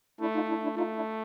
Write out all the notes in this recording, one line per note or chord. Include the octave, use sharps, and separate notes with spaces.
A3 D4 E4
D#4 F4
D4 E4
D4 E4
A3 D#4 F4
D4 E4